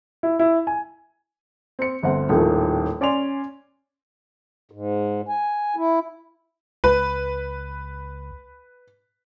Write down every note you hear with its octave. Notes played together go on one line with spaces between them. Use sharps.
E4
E4
G#5
C4 C#7
G1 D2 C4 F#5
D#1 D#2 A2 D#3 F3
C#4 D5 G#5 C6 F7
G#2
G#5
E4
C#2 B4